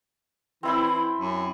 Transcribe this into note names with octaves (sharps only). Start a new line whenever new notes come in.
E3 C4 E4 C5
F#2